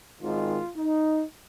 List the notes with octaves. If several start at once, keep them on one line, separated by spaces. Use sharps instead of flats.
G#1 G#2 D#3 F4
D#4